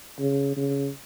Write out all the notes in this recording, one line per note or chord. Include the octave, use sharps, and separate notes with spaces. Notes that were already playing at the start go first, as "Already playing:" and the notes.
C#3
C#3